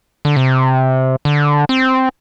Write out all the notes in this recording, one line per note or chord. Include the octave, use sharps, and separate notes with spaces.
D3
C3
D3
C4